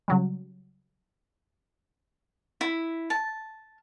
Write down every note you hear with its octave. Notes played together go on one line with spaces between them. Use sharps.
C#3 F#3 G3
E4
A5